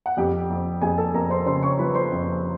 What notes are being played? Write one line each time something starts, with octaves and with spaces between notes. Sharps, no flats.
F#5
F2 G4 G5
F2
F2 G#4 G#5
A4 A5
F2 A#4 A#5
C5 C6
C#3 C5 C6
C#5 C#6
F3 B4 B5
C5 C6
F2